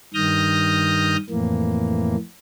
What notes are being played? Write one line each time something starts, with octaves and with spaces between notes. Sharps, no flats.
G2 D#3 D#6 F6 G6 A#6
F2 A2 E3 A#3